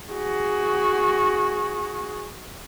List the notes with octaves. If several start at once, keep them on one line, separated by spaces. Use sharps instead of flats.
F#4 G#4